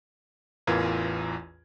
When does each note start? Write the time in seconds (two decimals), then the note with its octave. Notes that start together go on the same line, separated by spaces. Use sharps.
0.67 A1 E2 E3 F4 A#4 G#6